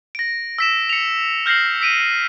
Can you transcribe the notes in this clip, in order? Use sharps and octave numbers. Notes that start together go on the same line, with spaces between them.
A#6 D7
E6 B6 E7
C#7 F7
F6 G6 A#6 C7 F#7
E6 B6 D7 D#7